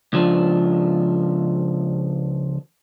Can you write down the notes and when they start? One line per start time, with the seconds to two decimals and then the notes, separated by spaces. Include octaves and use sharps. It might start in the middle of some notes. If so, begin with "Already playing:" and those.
0.13 C#2 F3 D4